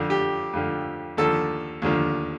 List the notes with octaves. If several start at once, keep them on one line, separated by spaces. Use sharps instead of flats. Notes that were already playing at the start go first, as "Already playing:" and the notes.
Already playing: F2 D3 F3
G4
F2 D3 F3
D#2 D3 F3 A4
D#2 D3 F3